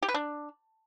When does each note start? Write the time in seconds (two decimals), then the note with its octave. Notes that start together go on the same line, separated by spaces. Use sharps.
0.02 G4
0.08 B4
0.14 D4